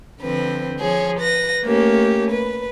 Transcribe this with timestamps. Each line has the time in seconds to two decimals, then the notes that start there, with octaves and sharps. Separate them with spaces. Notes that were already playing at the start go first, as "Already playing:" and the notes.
0.20 D3 F3 C4 B4
0.78 F3 G#4 C#5
1.19 B4 A#6
1.63 A3 A#3 C#4 G4
2.30 B4